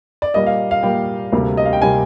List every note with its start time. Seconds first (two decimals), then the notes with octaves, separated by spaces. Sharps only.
0.22 D5
0.34 A#2 G3 A#3 D#5
0.46 F5
0.71 F5
0.83 A#2 G3 A#3 G5
1.32 D2 C3 G3 A#3
1.57 D#5
1.65 F5
1.73 G5
1.82 C3 G3 A#3 G#5